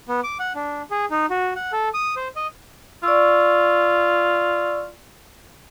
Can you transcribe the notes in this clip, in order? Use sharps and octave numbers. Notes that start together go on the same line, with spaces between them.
B3
D6
F#5
D4
G#4
D#4
F#4
F#5
A4
D#6
C5
D#5
F4 D5 C#6 E6